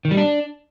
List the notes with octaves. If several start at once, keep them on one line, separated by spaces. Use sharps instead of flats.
D#3
G3
D4